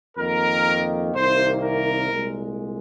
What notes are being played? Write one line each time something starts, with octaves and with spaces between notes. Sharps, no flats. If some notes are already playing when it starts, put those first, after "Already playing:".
F2 D#3 A#3 A#4
C2 C3 D#3 A#3 C5
A#4
C2 A#2 G#3